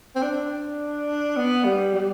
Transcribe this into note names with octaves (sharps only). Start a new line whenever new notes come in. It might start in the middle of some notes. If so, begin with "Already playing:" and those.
C4
D4
B3
G3
G3